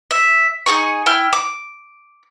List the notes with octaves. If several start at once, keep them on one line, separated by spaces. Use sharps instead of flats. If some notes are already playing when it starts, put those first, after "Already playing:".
E5
D#4 G#4 G#5 C#6
E4 G5 F6
D6